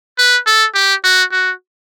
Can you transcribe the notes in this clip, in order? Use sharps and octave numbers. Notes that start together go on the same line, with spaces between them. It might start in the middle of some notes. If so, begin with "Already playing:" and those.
B4
A4
G4
F#4
F#4